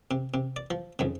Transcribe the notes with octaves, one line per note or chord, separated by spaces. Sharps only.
C3
C3
D5
F3
F2 G#2 C#3